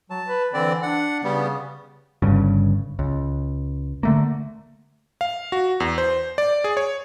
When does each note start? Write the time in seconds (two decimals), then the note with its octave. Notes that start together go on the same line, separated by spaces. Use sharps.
0.10 F#3 A5
0.27 B4
0.53 D3 E3 C4 D5
0.83 D4 F#5
1.24 C#3 G3 B3
2.22 G1 G2 C#3
2.99 C#2
4.03 D3 A3 A#3
5.21 F5
5.52 F#4
5.80 E2
5.98 C5
6.38 D5
6.64 G#4
6.77 C#5